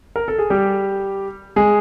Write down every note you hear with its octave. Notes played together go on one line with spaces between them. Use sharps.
A#4
A4
G#4
G3 G4
G#3 G#4